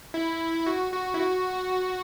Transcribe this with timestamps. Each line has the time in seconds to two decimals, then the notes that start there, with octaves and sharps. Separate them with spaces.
0.14 E4
0.66 F#4
0.93 F#4
1.14 E4
1.19 F#4